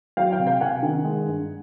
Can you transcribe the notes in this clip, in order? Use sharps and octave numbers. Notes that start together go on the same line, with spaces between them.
F#3 F5 G5
F5 G5
C3
F5 G5
C3 F#5 G#5
D#3
G#3
G2